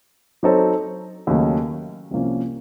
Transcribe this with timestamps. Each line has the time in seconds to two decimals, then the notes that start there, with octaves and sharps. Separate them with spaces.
0.43 F#3 C4 D#4 A4 C#5
1.27 D#2 C#3 F#3 A3 C#4
2.11 C2 C3 F3 A#3 C#4